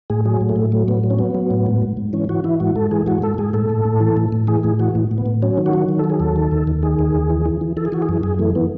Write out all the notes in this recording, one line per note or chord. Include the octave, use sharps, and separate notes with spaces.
A2 G#4
F#3 G#4
A2
A3
A2
F#3 A3
A2 B3
F#3
C#4
F#3 B3
F#3
A2
G#2
G#2
G#2
E3 C#4
E3 F#4
E3 E4
G#2 F#4
G#2 A4
E3 G#4
G#2 F#4
G#2 A4
G#2 G#4
A2 A4
A2
A2
E3
A2
A2
E3 G#4
A2 G#4
E3 F#4
A2
A2
B3
A2
F#3 C#4
D#3
F#4
F#3
D#3
F#3 A4
G#4
D#2 A4
D#3
D#2
D#2
D#3 G#4
D#2
D#2
E3
E3
E3
E3 A4
G#4
E3 F#4
G#4
F#2
F#2 G#4
E3 A3
E3 B3